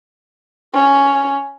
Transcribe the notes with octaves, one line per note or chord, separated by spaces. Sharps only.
C#4